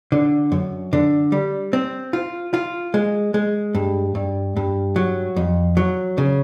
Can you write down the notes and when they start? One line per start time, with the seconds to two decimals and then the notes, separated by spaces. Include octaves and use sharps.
0.12 D3
0.52 F#2
0.93 D3
1.32 G3
1.73 C4
2.13 F4
2.54 F4
2.94 G#3
3.34 G#3
3.74 G2
4.15 G2
4.56 G2
4.96 F#3
5.36 F2
5.77 F#3
6.18 C#3